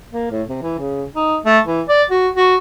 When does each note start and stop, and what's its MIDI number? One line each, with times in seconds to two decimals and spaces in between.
0.12 0.28 58
0.31 0.42 45
0.49 0.60 48
0.63 0.74 52
0.79 1.05 49
1.16 1.37 63
1.46 1.59 57
1.67 1.82 52
1.89 2.03 74
2.11 2.28 66
2.37 2.55 66